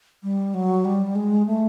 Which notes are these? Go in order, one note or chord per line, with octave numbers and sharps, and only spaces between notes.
G3
F#3
G3
G#3
A3